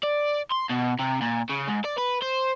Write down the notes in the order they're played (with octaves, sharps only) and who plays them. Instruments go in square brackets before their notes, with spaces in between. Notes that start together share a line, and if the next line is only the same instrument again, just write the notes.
[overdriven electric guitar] D5
C6
B2
C3
A#2
C#3
G#2
D5
B4
C5